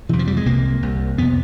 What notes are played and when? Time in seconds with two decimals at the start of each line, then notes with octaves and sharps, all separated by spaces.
0.09 F2 C3 E3
0.19 F3
0.27 G3
0.37 G#3
0.46 C2 C3 A#3
0.82 C2 C3
1.18 F2 C3 B3